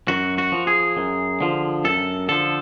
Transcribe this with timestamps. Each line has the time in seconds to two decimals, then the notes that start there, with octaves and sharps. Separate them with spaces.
0.08 F#2 F#4
0.38 F#4
0.52 F3
0.67 G#4
0.97 F#2
1.41 D3 F3
1.85 F#2 A4
2.28 D3 F3 A4